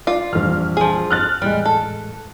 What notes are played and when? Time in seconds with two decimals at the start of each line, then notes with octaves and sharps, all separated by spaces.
0.07 F4 D5
0.33 A#1 F2 E3 G3 F6
0.77 F3 G#4
1.10 F6 F#6 A6
1.42 E2 A2 G3 G#3
1.65 A4